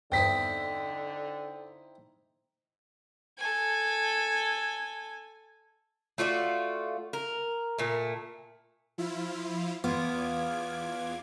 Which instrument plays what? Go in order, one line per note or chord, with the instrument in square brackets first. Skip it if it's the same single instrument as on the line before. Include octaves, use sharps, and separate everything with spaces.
[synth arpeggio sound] E2 G2 [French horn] D3 [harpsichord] C4 D#4 E4 [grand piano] G5 B6
[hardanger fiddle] A4 G#5
[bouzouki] A3 F4 F#4 D5
A#4
A#2 A3
[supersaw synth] F3 E4 F4
[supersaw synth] E2 D6 G#6 [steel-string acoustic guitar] B3 [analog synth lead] F4